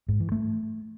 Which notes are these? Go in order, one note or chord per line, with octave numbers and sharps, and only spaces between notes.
G#2
E3
A3